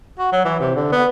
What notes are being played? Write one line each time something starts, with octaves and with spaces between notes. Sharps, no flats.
F#4
F#3
E3
C3
D3
B3